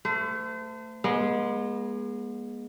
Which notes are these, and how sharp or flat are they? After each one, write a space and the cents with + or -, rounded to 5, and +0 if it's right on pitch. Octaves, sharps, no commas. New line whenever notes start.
A3 +25 C5 -35
G#3 +0 B3 -40